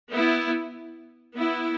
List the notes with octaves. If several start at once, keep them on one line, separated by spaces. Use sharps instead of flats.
B3 E4
B3 E4